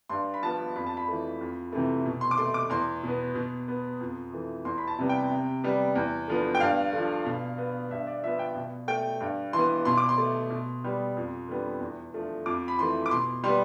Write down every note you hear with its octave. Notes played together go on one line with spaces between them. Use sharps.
G2 C6
B5
F3 B3 A5
F2 B5
A5
B5
E3 A3
F2
C3 E3 A3
B2
C6
D6
A3 C6
D6
E2 C6
B2 B3
B2
B3
F2
E3 A3
E2 C6
B5
A5
C3 G3 B3
G5
C3
G3 B3
E2
D3 F3 B3
G5
G2 F5
D3 F3
B2
B3
G2 E5
D5
F3 B3 E5
G5
B2
A3 G5
G2
E3 B3 C6
B2 C6
D6
C6
A3
B2
G3 B3
F2
D3 G3 B3
E2
D3 F3 A3
F2 D6
B5
E3 A3 C6
D6
B2 C6
G3 B3 C6